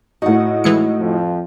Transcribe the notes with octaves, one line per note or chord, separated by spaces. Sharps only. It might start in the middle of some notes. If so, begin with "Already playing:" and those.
A2 D#4 F#4 F#5
E3 G#3 C#7
F2 F3